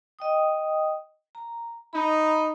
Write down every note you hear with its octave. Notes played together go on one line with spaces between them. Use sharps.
D#5 G5 D#6
A#5
D#4 A#5 B5